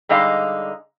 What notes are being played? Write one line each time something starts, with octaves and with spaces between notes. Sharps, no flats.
D3 G3 G#3 D#4 D#5 F5